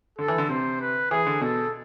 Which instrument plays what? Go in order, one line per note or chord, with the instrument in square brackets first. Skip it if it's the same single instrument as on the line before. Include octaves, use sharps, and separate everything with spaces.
[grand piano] D3 [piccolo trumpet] A4
[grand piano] E3
D3
[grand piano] C3 [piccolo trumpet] C5
[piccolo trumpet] B4
[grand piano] E3 [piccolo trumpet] G#4
[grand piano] D3
[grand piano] B2 [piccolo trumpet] A4